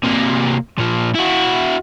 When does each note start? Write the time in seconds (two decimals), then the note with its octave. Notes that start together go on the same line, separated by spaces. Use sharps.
0.03 C3 A#3
0.78 A#2 F3
1.15 E4 F#4